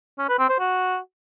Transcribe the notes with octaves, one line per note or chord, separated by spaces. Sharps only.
C#4
B4
C4
C5
F#4